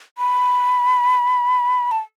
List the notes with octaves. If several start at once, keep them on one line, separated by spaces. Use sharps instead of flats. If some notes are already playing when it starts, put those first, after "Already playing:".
B5
A5